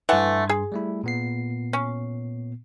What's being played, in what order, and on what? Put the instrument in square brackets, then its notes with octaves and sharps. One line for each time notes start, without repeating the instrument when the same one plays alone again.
[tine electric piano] G2 C6 [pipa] E3 A3 F#5
[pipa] G#4
[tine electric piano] G3 A3 E4
A#2 B3 C7
[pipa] C#4